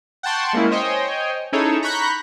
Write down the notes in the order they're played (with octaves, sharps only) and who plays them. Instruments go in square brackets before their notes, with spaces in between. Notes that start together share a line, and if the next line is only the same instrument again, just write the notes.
[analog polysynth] F#5 G5 A5 C6 C#6
G#3 A#3 C#4 E4
C5 C#5 D#5 G5 G#5
C#4 D#4 E4 G#4 A4 C#5
A#5 B5 C#6 F#6 G6 B6